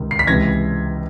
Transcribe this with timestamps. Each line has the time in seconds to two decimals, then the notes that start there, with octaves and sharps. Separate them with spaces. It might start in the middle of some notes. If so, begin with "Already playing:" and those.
Already playing: C#2 C3 D#3
0.11 C7
0.19 B6
0.27 C#2 C3 E3 G#6 A#6